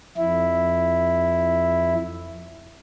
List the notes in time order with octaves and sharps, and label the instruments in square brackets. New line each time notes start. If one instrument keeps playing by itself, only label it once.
[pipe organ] F2 E4